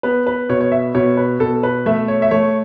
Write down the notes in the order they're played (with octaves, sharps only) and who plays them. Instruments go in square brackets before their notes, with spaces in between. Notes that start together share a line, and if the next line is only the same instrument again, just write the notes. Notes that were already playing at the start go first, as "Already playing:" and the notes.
[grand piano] B3 B4
B4
B2 C#5
C#5
E5
B2 C#5
B4
B2 A4
B4
A3 E5
C#5
E5
A3 C#5